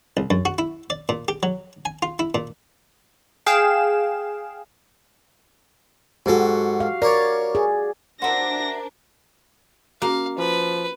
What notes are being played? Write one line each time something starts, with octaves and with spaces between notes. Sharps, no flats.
C2
F#2
F#4
E4
D5
A#2
G4
F#3
G#5
F4
E4
A#2
G#4 F5 G5 E7
G#2 F#4 G4 A4
F5
A#4 C#5 D5
G#4
D4 F#4 A#4 C5 E5 A#6
A#3 C#4 F#4 F5
F3 B4